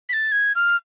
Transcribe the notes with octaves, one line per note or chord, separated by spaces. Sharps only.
B6
A6
G#6
F6